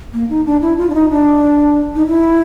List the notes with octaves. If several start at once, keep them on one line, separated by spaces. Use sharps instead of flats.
A#3
D#4
D4
E4
F4
D4
D#4
D4
D#4
E4